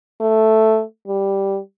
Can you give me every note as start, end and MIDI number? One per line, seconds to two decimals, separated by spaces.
0.21 0.82 57
1.08 1.58 55